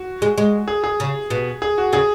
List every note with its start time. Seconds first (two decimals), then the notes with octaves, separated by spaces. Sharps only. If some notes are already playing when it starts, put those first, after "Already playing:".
Already playing: F#4
0.22 G#3
0.38 G#3
0.68 G#4
0.84 G#4
1.00 C#3
1.30 B2
1.62 G#4
1.78 F#4
1.93 C#3 G#4